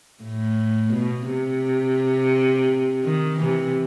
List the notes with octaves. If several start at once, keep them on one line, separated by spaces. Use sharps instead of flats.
A2
B2
C3
D#3
C3 E3